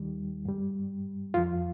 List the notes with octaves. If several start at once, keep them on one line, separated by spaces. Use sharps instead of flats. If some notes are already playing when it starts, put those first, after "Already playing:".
Already playing: D#2 D#3 G3
G2 G3
F2 F3 F4